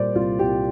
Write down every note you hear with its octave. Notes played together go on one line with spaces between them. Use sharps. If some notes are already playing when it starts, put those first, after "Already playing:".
Already playing: A#2 G3 C5 D5
C2 F4
C2 G4